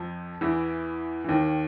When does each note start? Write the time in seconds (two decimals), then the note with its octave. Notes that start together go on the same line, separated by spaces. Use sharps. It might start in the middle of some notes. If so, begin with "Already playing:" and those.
Already playing: F2 F3
0.41 E2 E3
1.24 E3
1.28 D#2 D#3